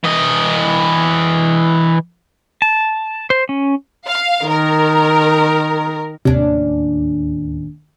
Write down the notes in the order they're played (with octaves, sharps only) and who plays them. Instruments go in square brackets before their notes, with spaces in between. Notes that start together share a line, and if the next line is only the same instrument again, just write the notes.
[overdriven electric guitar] E3 D#5
[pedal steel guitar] A5
C5
C#4
[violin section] F5
[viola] D#3 [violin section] A#4
[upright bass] D1 D#2 [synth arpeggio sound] C3 [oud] C#4 D4